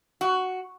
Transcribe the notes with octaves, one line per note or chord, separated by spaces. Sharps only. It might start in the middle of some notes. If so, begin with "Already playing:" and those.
F#4